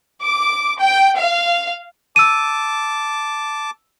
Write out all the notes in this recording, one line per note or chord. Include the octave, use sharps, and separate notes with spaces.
D6
G5
F5
A5 D6 E6 D#7